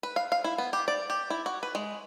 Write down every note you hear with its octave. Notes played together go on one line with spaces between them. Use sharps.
B4
F5
F5
E4
B3
G4
D5
G4
E4
F#4
B4
G#3